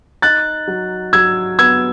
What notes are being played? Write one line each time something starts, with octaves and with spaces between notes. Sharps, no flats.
D#4 F#6 A6
F#3
F#3 E6 G#6
B3 E6 G#6